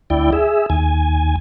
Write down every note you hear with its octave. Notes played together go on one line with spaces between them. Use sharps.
D2 E4 D5 G5
G#4 E5
D#2 G#5